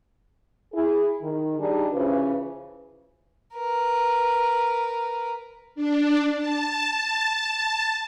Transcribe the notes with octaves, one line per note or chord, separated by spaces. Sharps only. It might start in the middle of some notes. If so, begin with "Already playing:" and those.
E4 G#4
D#3
G3 D4 D#4 G4 G#4
C#3 E3 F3 C#4 F#4 B4
A#4 B4
D4
A5